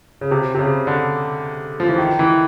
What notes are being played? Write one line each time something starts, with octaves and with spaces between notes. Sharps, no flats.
C#3
C3
C3
C#3
D3
F3
E3
D#3
E3